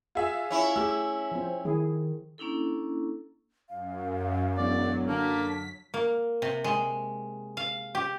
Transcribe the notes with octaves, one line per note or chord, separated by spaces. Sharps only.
F4 G#4 E5
C#4 E4
A3 G4 G#4 E6
F3 C4
D#3 E4 G#4
A#3 C#4 D4 E4 A4
F#2 F5
E1 F#3 D5
D3 A#3 A5 B6
A#3
C3
G#3
F5
G4